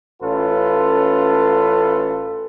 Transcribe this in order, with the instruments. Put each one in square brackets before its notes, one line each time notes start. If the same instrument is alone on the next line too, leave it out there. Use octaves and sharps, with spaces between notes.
[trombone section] A1 C#4 F4 A4 B4